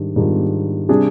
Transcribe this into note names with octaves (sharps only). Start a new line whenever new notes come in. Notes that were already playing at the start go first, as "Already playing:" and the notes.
Already playing: G#2 D#3 G3 D4
G#2 D#3 G3 D4 F4
C3 G3 D4 G#4